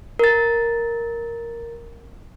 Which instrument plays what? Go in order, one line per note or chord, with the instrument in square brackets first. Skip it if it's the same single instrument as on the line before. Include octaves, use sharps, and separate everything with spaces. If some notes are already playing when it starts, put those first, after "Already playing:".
[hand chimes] A#4 A6